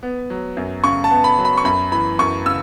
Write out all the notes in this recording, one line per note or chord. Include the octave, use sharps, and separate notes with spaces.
B3
F#3
F#2
C#3 C#6
A5
B3
B5
F#3
B5
C#6
F#2 B5
E3 B5
F#2 C#6
C#3 E6